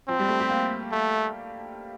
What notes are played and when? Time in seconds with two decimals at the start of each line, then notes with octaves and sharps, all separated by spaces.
0.08 F3 C4
0.20 G3
0.29 A3
0.40 G4
0.50 A#3
0.92 A3